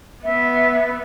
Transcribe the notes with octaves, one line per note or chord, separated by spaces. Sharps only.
B3 E5